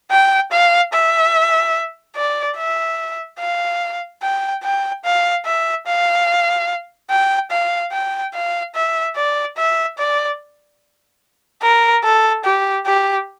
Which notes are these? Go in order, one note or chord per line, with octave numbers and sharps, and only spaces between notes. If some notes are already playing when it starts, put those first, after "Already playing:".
G5
F5
E5
D5
E5
F5
G5
G5
F5
E5
F5
G5
F5
G5
F5
E5
D5
E5
D5
A#4
A4
G4
G4